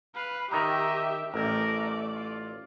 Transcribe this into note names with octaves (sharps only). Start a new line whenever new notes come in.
B4 F5
D#3 D#4 G4 D#5 E5 A#5
A1 A3 A#4 D5
F4